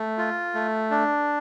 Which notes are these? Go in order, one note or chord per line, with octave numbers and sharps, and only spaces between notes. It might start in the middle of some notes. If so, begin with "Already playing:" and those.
Already playing: A3
F4
A3
D4